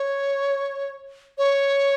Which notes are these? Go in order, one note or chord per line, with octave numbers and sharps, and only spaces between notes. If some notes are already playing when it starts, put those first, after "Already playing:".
Already playing: C#5
C#5